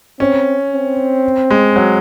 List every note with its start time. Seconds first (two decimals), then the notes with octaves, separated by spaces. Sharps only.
0.20 C4 C#4
0.72 C4
1.50 G#3
1.76 F#3